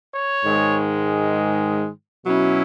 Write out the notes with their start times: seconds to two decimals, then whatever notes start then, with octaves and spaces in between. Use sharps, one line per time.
0.15 C#5
0.45 G#2 D#3 G#3
2.26 B2 F#3 C#4 E4